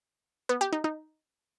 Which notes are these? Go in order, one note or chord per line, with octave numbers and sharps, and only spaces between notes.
B3
G4
D#4
D#4